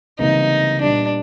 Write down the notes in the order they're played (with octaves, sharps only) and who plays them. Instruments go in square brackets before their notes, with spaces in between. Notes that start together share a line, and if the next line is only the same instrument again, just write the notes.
[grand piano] C#2 C3 E3 G3 A#3 [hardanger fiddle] D#4
[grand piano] A#2 G3 B3 [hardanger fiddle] D4